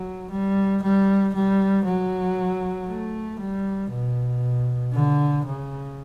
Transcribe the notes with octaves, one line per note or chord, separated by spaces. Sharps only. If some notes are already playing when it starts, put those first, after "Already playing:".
Already playing: F#3
G3
G3
G3
F#3
A3
G3
B2
D3
C#3